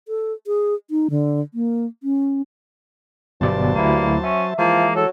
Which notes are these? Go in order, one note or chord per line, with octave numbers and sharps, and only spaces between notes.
A4
G#4
D#4
D3
A#3
C#4
G1 G2 B2 F#3 C5 D5 A5
D2 A#3 E4
C#4 E5
E3 F3 G#3 A#3
F#3 A4